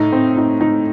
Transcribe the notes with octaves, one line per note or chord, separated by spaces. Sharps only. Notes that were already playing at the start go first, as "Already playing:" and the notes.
Already playing: A2 D#4
C4
D#4
D#4